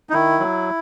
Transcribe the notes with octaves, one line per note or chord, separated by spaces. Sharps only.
D#4
D#3 E4
F#3